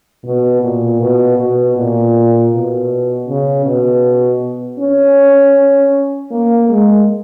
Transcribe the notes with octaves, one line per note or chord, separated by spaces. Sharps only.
B2
A#2
B2
B2
A#2
B2
C#3
B2
C#4
A#3
G#3